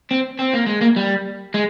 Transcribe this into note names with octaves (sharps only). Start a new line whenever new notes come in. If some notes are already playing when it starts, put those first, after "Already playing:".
C4
C4
A#3
G#3
A#3
G3
G#3